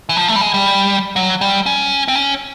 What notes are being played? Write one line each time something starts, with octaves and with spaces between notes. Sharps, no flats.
E3
F3
A3
G3
G#3
G3
F#3
G3
C#4
C4
C#4